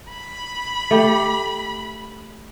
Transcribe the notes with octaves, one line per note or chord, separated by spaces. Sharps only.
B5
A3 G4